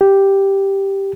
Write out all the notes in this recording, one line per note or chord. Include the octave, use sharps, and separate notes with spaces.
G4